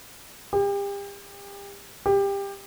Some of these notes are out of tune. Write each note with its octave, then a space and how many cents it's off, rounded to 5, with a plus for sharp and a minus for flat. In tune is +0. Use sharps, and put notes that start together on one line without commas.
G4 +35
G4 +20